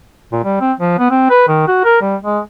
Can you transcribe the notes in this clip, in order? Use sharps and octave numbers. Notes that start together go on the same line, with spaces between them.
A#2
G3
C4
F3
B3
C4
B4
D#3
F#4
A#4
G3
G#3